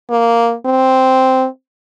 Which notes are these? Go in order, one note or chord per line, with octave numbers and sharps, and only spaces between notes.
A#3
C4